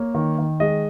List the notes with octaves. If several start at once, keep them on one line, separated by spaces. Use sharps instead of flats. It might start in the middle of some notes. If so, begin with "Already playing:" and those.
Already playing: A#3 C#5
D#3
D#3
G#3 D#5